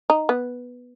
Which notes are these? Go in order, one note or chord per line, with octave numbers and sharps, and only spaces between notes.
D#4
B3